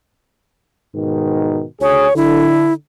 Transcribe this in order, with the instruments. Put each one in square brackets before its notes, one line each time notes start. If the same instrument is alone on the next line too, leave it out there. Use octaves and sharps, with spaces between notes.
[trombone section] G#2 B2 D#3
[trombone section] D2 G#4 [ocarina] C#5
[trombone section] D3 [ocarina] E4